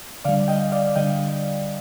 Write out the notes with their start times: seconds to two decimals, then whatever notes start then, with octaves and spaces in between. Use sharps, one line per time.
0.25 D3 G3 D5 F5
0.48 D#5 G5
0.72 D5 F5
0.96 D3 G3 D#5 G5